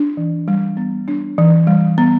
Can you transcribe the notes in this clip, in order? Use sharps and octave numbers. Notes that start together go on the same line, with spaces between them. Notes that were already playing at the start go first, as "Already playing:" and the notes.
Already playing: D4
E3
G3
B3
D4
E3
G3
B3